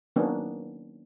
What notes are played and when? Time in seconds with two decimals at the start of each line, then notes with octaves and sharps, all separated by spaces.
0.16 D#3 F#3 A#3 B3 C#4 D4